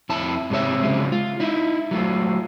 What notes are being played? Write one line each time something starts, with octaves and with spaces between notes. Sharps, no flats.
F2 E4 A5
G#2 C3 G#3 C#5 E5
C#3 F3 F#3 G#3
F4
D#4 E4
F#3 A3 F4